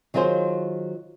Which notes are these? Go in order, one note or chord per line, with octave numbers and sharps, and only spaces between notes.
D#3 F#3 F4 G#4 C5